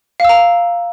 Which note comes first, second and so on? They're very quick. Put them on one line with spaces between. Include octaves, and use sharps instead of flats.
F5 E6 A#5